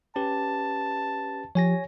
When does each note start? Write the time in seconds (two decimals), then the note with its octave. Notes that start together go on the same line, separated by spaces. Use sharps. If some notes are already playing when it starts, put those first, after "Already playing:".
0.16 C#4 G4 B4 A5
1.55 F3 G4 C#5 G#5 A#6